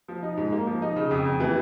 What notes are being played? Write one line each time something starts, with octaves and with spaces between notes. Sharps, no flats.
F3
D#4
G#2
A#3
F3
D#4
C#3
F2
F2
E3